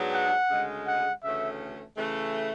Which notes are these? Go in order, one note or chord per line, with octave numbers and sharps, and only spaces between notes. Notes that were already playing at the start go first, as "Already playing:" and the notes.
Already playing: G#2 F#3 B3 D4 G#4
F#5
D2 C#3 G#3
F#5
D2 C#3 E3 A3 C#4 E5
C#3 E3 A3